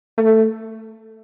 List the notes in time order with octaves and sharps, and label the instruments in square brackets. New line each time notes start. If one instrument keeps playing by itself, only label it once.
[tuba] A3